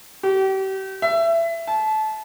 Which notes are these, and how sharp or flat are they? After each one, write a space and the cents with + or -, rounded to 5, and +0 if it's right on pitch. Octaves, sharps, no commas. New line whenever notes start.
G4 -35
E5 +20
A5 -25